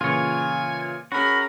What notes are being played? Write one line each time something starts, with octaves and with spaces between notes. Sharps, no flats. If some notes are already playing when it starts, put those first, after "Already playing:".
A#2 C#3 E3 F4 C#5 G#5
C#4 F#4 G#4 A#4 B5